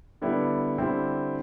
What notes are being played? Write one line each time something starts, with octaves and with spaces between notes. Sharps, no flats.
D3 G3 B3 E4
D3 G3 C4 E4